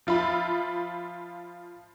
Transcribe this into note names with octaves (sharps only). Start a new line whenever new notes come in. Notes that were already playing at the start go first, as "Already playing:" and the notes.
F3 F4 E5 B5